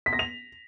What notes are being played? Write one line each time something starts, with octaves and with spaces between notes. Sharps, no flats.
B6
A#6
F7